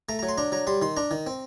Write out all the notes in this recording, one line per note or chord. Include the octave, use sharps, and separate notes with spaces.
A3 A#5
F#3 A#5
C6
D4 A#5
F#3 A#5
G3 C6
D#3 C6
D4 A#5
D#3
C4